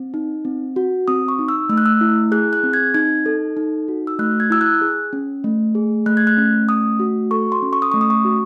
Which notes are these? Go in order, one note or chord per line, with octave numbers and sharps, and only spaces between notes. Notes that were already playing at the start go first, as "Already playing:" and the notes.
Already playing: C4
D#4
C4
F#4
C4 D#6
C#6
D#4
E6
A3 E6
F#6
E6
E4
G#4 F#6
F#6
C4
G#6
D#4 G#6
A4
D#4
F#4
E6
A3 F#6
G#6
E4 E6
F#6
G#4
C#4
A3
G#4
A3 F#6
G#6
F#6
C#4
A3 D#6
F#4
A4 C#6
C6
C#4
C#6
D#6
A3 C#6
D#6
C#6
F#4